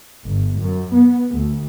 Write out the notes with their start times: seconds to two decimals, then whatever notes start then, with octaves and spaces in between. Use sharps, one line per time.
0.24 G1
0.58 F#2
0.94 B3
1.35 D2